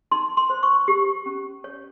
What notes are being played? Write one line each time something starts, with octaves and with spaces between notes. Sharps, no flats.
D#4 C6
C6
C5
C#6
G4
C#4
C#5